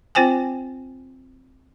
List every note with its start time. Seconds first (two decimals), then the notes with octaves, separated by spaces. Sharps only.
0.15 C4 F4 C5 G5 G#5